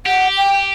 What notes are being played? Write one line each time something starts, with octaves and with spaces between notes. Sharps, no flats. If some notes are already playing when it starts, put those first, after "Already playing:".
G4 F#5
G5